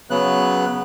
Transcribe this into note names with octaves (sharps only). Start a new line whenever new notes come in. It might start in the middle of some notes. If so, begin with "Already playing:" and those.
C#3 F#3 B3 F#6